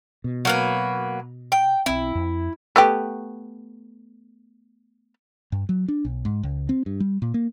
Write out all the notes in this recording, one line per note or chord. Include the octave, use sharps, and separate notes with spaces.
B2
F#3 A#3 B4
G5
B1 C4 E4
F2
A3 B3 G4
G2
F#3
D4
B1
G#2
C#2
C4
G2
G3
A#2
A#3